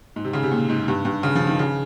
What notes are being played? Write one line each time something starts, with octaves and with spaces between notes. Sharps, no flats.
G#2
C3
C#3
C3
A#2
G#2
G2
G2
C#3
F3
D#3
C#3